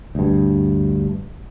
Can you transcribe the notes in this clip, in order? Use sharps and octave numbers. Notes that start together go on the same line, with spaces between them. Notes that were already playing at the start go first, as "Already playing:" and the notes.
D2 G2